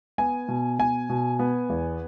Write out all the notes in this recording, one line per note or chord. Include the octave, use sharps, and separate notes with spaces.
B3 G#5
B2
B2 G#5
B2
B3
E2